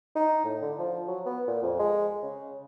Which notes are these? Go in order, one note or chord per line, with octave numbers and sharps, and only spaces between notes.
D#4
A2
D3
F3
F#3
B3
A#2
F2
G#3
C#3